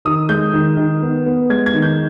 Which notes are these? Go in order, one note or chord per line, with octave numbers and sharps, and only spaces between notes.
D#3 D#6
G#3 G6
D#3
D#3
B3
B3
G#3 G#6
G#6
D#3
G6